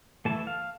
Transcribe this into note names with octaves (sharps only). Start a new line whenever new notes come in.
E3 A3 E4 A5
F5